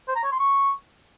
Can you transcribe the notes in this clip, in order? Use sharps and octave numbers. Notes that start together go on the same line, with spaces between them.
C5
A#5
C#5
C6
C#6